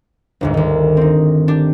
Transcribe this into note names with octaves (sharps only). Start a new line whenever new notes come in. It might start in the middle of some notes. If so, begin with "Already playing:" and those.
G1 D2 G#2
D2 D#3
C4 D#4
D4 G4